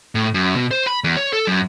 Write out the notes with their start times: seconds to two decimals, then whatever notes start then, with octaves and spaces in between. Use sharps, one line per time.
0.15 A2
0.34 F#2
0.56 B2
0.71 C5
0.87 B5
1.04 E2
1.17 C#5
1.33 A4
1.47 F#2